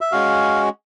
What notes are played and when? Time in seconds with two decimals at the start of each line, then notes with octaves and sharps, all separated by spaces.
0.01 E5
0.12 G#3 C#4 F#4 F5